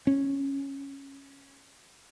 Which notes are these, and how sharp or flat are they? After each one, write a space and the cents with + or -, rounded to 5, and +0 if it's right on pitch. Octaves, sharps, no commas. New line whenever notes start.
C#4 -5